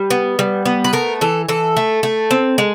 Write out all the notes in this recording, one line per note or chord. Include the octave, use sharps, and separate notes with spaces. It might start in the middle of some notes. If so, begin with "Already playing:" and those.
Already playing: G3 B4
B3
G3
B3
B4
A3 A#4
E3 A4
E3 A4
A3
A3
C4
G#3